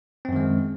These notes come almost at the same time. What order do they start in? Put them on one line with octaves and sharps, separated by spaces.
C4 F#2 D#3 G#3